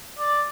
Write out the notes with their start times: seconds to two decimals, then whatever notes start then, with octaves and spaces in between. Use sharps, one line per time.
0.19 D5